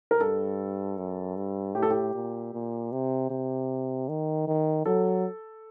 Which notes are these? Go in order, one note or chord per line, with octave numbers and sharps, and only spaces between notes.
A#4
G2 A4
F#2
G2
A2 G4
A4
G4
A#2
A#2
C3
C3
D#3
D#3
F#3 A4